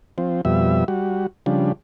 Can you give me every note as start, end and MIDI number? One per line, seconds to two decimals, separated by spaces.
0.18 0.41 53
0.18 0.41 60
0.45 0.84 41
0.45 0.84 47
0.45 0.84 55
0.45 0.84 76
0.88 1.27 55
0.88 1.27 66
1.46 1.72 49
1.46 1.72 53
1.46 1.72 55
1.46 1.72 62